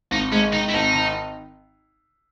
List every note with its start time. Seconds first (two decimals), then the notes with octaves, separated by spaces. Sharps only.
0.11 G#1 D#4
0.32 G#2 C#4
0.53 D#3 D#4
0.69 E4
0.74 G#1 D#4
0.95 D#3